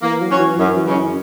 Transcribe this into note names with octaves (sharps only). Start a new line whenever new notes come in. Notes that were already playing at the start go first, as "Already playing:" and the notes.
E3 A#3
F#3
C#4 F#4 C#5
E3
F#2 F#3
E3
C#3 G#3 C#4
F#2